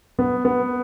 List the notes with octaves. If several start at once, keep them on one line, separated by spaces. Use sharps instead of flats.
B3
B3